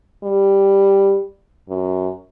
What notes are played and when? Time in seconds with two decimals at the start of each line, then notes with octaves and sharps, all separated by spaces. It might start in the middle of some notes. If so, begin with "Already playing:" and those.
0.24 G3
1.69 F#2